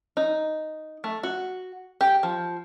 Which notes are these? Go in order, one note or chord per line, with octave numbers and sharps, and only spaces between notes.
D#4
A3
F#4
G4
F3